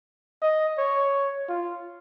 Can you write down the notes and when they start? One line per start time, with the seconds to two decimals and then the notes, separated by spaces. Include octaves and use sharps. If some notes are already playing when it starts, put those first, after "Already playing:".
0.42 D#5
0.78 C#5
1.49 F4